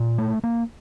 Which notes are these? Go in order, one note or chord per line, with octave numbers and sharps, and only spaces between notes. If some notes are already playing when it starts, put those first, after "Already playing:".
Already playing: A#2
A3
A#3